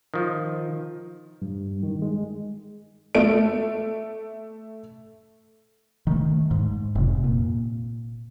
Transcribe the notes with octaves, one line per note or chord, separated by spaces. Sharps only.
D#3 F3
G2
D#3
G#3
A3 D7
D#3 A3
G#2
F1 C3
A#2